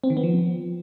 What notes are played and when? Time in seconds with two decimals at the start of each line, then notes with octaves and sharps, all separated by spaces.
0.04 C4
0.10 D#3
0.17 B3
0.23 F3